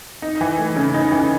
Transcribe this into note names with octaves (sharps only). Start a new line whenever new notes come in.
D#4
E3
A3
C#3
D#4
E3